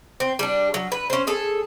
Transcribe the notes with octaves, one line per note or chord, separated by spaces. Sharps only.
C4
G3 D4
F#3
B4
C#4 C5
G#4 A4 A5